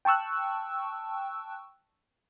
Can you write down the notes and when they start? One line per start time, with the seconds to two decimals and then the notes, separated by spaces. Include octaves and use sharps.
0.05 G5 A5 C#6 E6 F#6